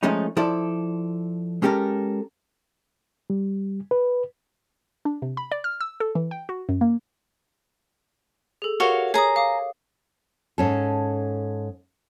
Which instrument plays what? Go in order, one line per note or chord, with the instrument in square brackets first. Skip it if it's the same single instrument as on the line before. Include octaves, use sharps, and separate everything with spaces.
[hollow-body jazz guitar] F3 G#3 A3 C#4 D#4
F3 E4 A4 D5
G#3 C#4 G4 A4 A#4
[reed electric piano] G3
B4
[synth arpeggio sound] D4
C3
B5
D5
F6
E6
A4
E3
G5
F#4
F#2
A#3
[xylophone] G#4 A4
[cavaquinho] F#4 C#5 F5 [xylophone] G4 A#4
[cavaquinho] G#4 A#5 [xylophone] C#5 D#6
[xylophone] F5 D6 D#6
[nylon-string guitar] G#2 C#4 A4